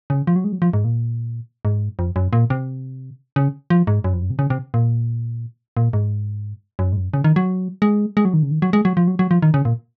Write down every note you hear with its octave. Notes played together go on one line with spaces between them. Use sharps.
C#3
F3
F#3
G#3
F#3
F3
G#2
A#2
G#2
F2
F#2
A#2
C3
C#3
F3
G#2
F#2
F2
F#2
C3
C#3
C3
A#2
A#2
G#2
F#2
G#2
F#2
C#3
D#3
F#3
G#3
G#3
F#3
D#3
C#3
D#3
F#3
G#3
F#3
F3
F#3
F#3
F3
D#3
C#3
A#2